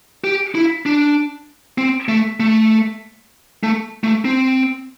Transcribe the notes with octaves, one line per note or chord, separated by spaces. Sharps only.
G4
E4
D4
C4
A3
A3
A3
A3
C4